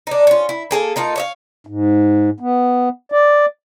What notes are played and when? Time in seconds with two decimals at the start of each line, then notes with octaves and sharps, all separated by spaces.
0.07 D4 D#4
0.27 C#4 F4
0.49 E4
0.71 A#3 G#4 A4
0.96 A#3 D#4 F4 A4
1.16 C#5 D#5 F5
1.67 G#2
2.40 B3
3.12 D5